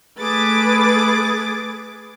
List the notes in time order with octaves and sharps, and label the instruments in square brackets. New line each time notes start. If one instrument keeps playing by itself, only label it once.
[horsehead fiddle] A3 B4 [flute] G#4 [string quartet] D6 A6